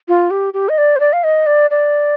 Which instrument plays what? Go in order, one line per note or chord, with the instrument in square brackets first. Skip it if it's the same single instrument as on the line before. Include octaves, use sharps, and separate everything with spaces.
[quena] F4
G4
G4
D#5
D5
C5
D5
F5
D#5
D5
D5